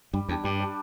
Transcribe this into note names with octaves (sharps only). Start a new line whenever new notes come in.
G2 G3
E2 D4 G4
G2 G3
D4 G4